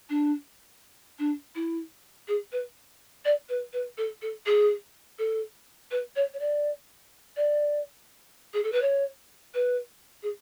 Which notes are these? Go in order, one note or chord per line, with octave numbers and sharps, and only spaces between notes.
D4
D4
E4
G#4
B4
D5
B4
B4
A4
A4
G#4
A4
B4
C#5
C#5
D5
D5
G#4
A4
B4
C#5
B4
G#4